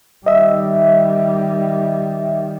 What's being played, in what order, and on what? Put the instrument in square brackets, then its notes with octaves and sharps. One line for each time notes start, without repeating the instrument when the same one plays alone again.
[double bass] D#3 G3 [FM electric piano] D#5 E5